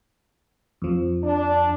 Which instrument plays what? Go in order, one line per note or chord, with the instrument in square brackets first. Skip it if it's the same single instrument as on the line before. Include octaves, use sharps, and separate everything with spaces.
[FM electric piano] F2 F3
[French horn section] D4